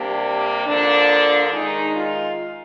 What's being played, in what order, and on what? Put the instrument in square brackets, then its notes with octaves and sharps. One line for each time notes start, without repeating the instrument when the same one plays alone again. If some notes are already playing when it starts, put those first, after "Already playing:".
Already playing: [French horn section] C3 G3 A#3 D4
D3 F3 A#3 D4
D#3 G#3 D#4
F4